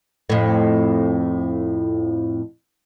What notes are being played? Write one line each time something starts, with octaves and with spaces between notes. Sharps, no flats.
F2 A2